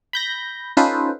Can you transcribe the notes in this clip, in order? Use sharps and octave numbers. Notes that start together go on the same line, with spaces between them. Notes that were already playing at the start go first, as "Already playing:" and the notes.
B5 G6 A#6
C#4 D#4 F4 A4 B4 C5